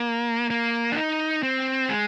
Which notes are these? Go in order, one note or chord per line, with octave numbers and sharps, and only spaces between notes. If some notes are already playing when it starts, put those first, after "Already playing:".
Already playing: A#3
A#3
D4
D#4
C4
G#3